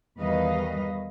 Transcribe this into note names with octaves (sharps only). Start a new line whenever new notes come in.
E2 D#3 G3 B4 D#5 F5